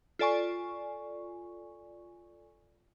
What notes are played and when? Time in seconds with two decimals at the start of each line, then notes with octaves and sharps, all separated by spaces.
0.19 F4 A4 D5 G#5 C#6